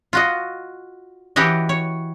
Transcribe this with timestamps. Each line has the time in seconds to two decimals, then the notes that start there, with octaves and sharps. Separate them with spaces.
0.13 F4 F#4 D#5
1.36 E3 F#4 G4 C#5 D#5
1.69 C#5